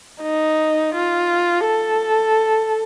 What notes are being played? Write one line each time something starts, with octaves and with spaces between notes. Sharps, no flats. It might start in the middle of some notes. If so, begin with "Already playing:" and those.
D#4
F4
A4